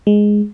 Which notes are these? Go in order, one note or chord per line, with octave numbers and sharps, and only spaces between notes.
G#3